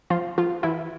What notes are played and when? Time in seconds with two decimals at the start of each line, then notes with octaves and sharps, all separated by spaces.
0.10 F3 F4
0.38 F3 F4
0.63 E3 E4